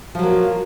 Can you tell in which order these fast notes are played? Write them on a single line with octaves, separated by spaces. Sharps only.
F3 F#3 A#3